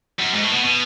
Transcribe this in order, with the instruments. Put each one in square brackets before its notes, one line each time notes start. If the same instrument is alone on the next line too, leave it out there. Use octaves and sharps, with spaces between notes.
[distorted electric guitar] F#2
G#2
A2
B2
B2